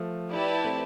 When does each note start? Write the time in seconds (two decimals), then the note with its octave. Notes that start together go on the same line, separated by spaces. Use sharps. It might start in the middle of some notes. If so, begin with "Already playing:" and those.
Already playing: F3 A3
0.31 E4 G4 B4 D5 A5
0.64 A3 C4